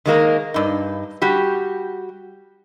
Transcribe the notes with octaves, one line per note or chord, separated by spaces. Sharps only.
D#3 G#3 A#3 A#4
G2 D#4
G3 F#4 G4